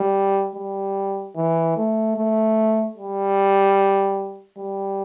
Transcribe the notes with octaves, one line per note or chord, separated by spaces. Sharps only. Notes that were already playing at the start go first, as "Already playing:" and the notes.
Already playing: G3
G3
E3
A3
A3
G3
G3